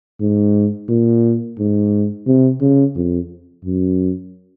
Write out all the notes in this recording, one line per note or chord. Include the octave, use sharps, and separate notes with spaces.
G#2
A#2
G#2
C3
C#3
F2
F#2